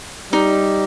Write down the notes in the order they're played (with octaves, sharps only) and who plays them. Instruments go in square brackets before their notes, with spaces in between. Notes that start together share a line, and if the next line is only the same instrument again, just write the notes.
[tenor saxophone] G3 [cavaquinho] D#4